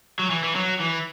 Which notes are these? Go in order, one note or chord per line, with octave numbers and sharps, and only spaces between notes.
F#3
E3
E3
F#3
E3